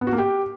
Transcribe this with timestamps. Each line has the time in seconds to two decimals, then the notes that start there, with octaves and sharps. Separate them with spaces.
0.01 B3
0.07 F#4
0.13 A#3
0.18 G4